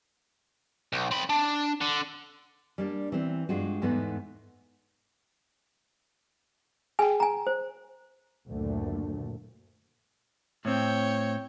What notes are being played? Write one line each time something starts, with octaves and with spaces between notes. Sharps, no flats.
B1
C4 B5
D4
D3
G3 A#3 D4
E3 C4
G2 G#3 F4 F#4
E2 G#2 A3 B3 D#4 F#5
G#4 G5 G#5
G#5 A#5
C5
F#1 D2 A#2 D3 A3
A2 C4 C#5 G5